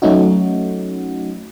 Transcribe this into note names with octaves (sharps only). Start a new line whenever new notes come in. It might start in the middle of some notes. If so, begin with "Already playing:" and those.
F#3 A3 C#4 D#4 F#4